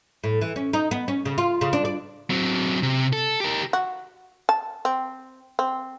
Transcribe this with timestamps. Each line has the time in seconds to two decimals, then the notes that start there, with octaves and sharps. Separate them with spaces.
0.24 A2
0.41 E3
0.56 C#4
0.73 D#4
0.91 B3
1.08 C#4
1.26 C#3
1.38 F4
1.61 C#3
1.73 D4
1.85 D5
2.30 F#3 C4
2.83 C3
3.13 A4
3.40 G4 A#4
3.73 F#4
4.49 A5
4.85 C4
5.59 C4